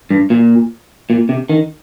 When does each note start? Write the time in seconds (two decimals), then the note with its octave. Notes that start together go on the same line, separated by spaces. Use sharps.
0.10 G2
0.30 A#2
1.10 A#2
1.29 C3
1.49 D#3